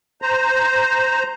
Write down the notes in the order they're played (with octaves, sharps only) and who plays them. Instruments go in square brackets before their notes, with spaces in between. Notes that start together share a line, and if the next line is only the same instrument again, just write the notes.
[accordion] C5 A#5